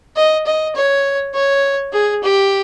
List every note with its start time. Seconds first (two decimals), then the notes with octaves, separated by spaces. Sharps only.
0.16 D#5
0.46 D#5
0.75 C#5
1.34 C#5
1.93 G#4
2.23 G4